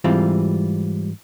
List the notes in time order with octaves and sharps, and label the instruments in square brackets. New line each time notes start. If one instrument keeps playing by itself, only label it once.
[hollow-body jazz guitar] G#2 E3 G3 C4 F4